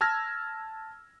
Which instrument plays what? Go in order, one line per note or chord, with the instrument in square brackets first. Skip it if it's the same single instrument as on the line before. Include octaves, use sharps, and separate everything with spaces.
[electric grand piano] A5 E6 F6 G#6 A#6